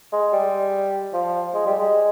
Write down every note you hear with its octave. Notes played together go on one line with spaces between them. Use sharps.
G#3
G3
F3
G#3
G3
G#3